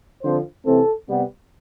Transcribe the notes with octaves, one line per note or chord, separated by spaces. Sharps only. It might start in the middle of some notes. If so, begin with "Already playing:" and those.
D3 F3 C4 C5
C3 E3 A3 C4 A4
C3 G3 B3